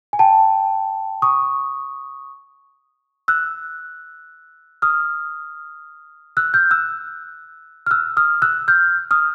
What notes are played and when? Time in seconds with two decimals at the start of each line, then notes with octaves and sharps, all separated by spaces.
0.13 G#5
0.19 G5 A5
1.22 C#6 D#6
3.28 E6 F#6
4.82 D#6 F6
6.37 E6 F#6
6.54 F6 G6
6.71 E6 F#6
7.86 F6
7.91 E6 F#6
8.17 D#6 F6
8.42 E6 F#6
8.68 F6 G6
9.11 D#6 F6